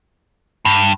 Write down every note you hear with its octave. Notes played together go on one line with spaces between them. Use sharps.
G2